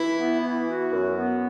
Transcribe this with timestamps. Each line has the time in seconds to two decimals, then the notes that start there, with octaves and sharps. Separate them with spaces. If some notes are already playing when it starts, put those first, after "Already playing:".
Already playing: E3 E4
0.18 B3
0.43 E3
0.68 F#4
0.92 F#2
1.17 B3